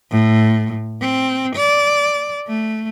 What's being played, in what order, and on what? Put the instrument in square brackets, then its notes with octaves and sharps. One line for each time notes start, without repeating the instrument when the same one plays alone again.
[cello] A2
C4
D5
A3